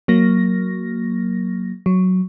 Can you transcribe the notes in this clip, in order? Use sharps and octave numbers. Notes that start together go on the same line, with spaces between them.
F#3 A#3 A#6
F#3